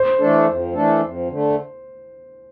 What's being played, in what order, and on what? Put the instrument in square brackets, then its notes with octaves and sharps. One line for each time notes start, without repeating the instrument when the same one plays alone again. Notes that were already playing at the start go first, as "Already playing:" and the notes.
Already playing: [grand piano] C5
[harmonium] E3 A3 D4 A4
F2
E3 A3 D4 A4
F2
D3 A3